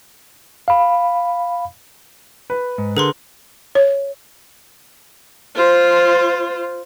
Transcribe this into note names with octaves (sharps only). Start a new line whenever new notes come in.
F5 B5
B4
G#2
D3 G#4 A#4 B4 C6
C#5
F4 C5